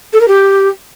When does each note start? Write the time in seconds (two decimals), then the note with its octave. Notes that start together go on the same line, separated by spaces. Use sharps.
0.13 A4
0.20 A#4
0.28 G4